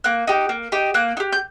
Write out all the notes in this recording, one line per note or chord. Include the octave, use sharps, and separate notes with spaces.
A#3 F#6
D#4 G4
A#3
D#4 G4
A#3 F#6
D#4
G4
G6